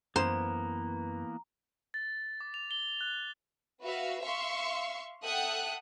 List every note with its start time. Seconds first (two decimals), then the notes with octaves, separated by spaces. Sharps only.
0.16 F#2 E3 A#3 B3 C5 A#5
1.94 A6
2.41 D6
2.54 F7
2.71 G7
3.01 F#6
3.82 F#4 B4 E5 F5
4.22 E5 F5 C6 C#6
5.23 A4 E5 F#5 G5 D#6 F#6